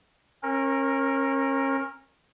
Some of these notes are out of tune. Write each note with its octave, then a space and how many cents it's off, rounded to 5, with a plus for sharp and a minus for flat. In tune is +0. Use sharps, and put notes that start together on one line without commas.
C#4 -35 A#4 +0